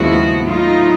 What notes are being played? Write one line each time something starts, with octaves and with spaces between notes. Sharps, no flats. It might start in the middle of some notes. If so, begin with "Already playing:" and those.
Already playing: D#2 C#3 F3 G#3 B3 E4 F#4
A2 F#3 B3 D#4 F4